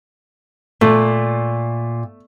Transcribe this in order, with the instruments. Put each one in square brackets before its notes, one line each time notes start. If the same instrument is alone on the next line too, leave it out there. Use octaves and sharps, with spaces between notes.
[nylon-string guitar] A#2 [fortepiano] A3